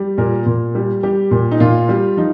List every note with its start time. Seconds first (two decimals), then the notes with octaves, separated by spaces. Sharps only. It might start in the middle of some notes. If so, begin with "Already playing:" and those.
Already playing: G3
0.18 A#2 A#4
0.46 A#2
0.75 G3
1.03 G3 G4
1.31 A#2
1.51 D#4
1.60 A#2 F4
1.89 G3
2.17 F3 D#4